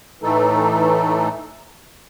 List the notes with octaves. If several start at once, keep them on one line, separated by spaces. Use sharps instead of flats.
A2 E3 A3 D#4 A4